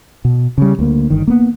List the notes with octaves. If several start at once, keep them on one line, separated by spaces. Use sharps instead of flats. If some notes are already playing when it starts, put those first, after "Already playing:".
B2
C#3 G3
D2 A#3
G1 D#3
A#3 B3